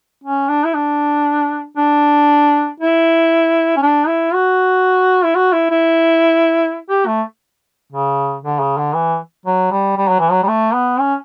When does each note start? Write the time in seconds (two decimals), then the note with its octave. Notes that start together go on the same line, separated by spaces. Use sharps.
0.24 C#4
0.49 D4
0.64 E4
0.74 D4
1.77 D4
2.80 E4
3.77 C#4
3.82 D4
4.07 E4
4.34 F#4
5.24 E4
5.35 F#4
5.53 E4
5.70 E4
6.89 G4
7.06 A3
7.92 C#3
8.43 D3
8.60 C#3
8.77 D3
8.94 E3
9.45 F#3
9.71 G3
9.97 G3
10.08 F#3
10.20 E3
10.31 F#3
10.43 G3
10.48 A3
10.74 B3
11.00 C#4